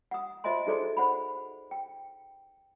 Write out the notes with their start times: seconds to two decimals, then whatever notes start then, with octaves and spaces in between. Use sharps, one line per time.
0.11 F#5 D#6
0.44 F4 C5 D#5 E5 G#5 C6
0.67 D#4 F#4 G#4 A4 C5 D5
0.97 C5 F#5 B5
1.71 G5